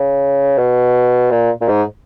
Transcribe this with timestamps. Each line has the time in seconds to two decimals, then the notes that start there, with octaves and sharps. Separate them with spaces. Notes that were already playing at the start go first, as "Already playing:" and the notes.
Already playing: C#3
0.58 B2
1.31 A#2
1.61 A#2
1.69 G#2